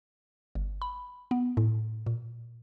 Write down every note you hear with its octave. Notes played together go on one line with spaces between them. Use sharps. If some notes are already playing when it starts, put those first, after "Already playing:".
G1
B5
B3
A2
A#2